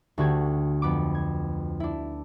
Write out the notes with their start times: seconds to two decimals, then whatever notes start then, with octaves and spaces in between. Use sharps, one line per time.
0.18 D2 D3 F#4 G4 G#6
0.82 F2 B3 B5 D6
1.15 G#6
1.80 D4 E4